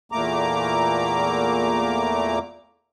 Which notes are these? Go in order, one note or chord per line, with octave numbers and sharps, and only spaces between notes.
E2 A#2 A3 A#3 A#5 D6